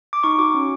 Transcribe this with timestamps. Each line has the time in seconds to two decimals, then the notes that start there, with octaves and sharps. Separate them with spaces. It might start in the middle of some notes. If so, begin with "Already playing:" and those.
0.13 D6
0.23 D#4 C#6
0.39 F#4 D6
0.54 C#4